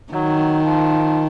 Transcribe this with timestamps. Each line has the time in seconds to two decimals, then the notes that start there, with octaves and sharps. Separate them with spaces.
0.13 D#3 F#3
0.65 F3